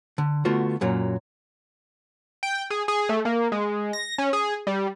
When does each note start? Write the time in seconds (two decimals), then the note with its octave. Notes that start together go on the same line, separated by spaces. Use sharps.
0.18 D3
0.45 D3 A3 B3 F4 F#4
0.81 F#2 A#2 F#3
2.43 G5
2.70 G#4
2.88 G#4
3.09 A3
3.25 A#3
3.52 G#3
3.93 A#6
4.18 C#4
4.33 G#4
4.67 G3